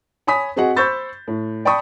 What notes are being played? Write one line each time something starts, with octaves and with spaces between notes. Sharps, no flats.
C#5 G#5 B5 D#6 B6
C4 F#4 G#4 D#5 F#5
C5 B5 C#6 E6 G6 A6
A2
D5 G5 A5 B5 C#6 D#6